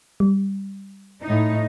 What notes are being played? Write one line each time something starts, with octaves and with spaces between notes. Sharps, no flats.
G3
A2 D#4